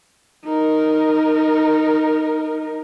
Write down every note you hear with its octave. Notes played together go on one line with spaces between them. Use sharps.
D#4 A#4